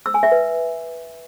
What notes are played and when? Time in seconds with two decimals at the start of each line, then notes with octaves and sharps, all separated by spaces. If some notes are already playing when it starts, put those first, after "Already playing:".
0.06 E6
0.14 G#5
0.23 E5
0.32 B4